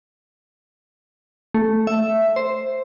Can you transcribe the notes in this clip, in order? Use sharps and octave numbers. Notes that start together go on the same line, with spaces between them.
A3
E5
C5